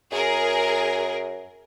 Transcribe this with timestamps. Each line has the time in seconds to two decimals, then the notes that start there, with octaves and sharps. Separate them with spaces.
0.12 F#2 G#4 A#4